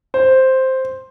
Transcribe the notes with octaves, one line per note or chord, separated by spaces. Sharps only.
C5